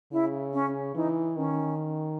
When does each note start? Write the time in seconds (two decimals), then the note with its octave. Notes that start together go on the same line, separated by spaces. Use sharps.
0.12 C#3 E4
0.53 C#4
0.95 E3 D#4
1.37 D#3 C#4